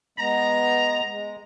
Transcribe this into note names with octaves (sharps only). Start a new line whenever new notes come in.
G#3 B3 A#5
G#3